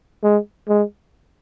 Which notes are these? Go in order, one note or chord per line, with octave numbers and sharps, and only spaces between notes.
G#3
G#3